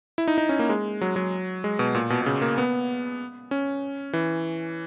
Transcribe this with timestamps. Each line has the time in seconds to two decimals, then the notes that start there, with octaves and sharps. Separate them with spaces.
0.18 E4
0.28 D#4
0.38 D#4
0.49 C#4
0.59 A#3
0.69 G#3
1.01 F#3
1.16 F#3
1.64 G#3
1.79 B2
1.95 A#2
2.10 B2
2.22 B2
2.26 C#3
2.41 A#3
2.58 B3
3.51 C#4
4.13 E3